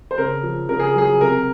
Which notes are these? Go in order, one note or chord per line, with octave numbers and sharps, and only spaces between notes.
C5
C#3 A#4
F3
C#3 A#4
G#4
F#3 G#4
C3 A#4